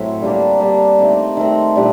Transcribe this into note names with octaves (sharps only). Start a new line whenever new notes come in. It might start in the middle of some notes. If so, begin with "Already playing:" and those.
Already playing: A2 F#3 C4
D3 G3 A#3 D4
D3 G3 A#3 D4
D#3 A3 C4
D#3 A3 C4
A#2 G3 D4 G4